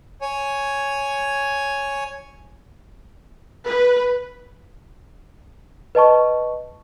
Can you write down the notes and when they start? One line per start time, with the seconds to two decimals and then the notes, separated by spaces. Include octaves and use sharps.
0.21 C#5 G#5
3.65 B4
5.95 B4 D#5 A5 C#6